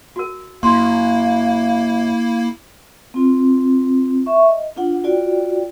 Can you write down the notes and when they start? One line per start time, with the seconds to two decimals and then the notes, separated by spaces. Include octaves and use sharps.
0.16 F#4 A#4
0.63 F#2 A#3 E4 F5 C6
3.14 C4 F4
4.26 E5 C#6
4.48 D#5
4.76 D4 F4 F#5
5.04 F4 F#4 D5 G5